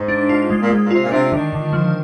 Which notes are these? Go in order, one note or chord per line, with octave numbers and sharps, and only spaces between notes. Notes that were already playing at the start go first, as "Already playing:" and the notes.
Already playing: G#2
D4
F4
G#3
A#2
G#2 G#3
A#2
C3 F4
A#2
C3 D4
D3 D#3
D3
F3